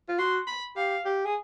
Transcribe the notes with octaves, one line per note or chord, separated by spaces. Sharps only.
F4
F#4 C6
B5
G4 F5
G4
G#4